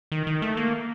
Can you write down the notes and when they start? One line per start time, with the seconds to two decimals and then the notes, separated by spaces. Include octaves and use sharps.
0.12 D#3
0.27 D#3
0.42 A3
0.57 A#3